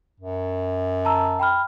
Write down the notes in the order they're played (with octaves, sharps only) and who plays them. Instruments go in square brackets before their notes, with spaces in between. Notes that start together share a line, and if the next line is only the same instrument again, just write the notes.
[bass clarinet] F#2
[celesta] A5 A#5 E6
G5 B5 F6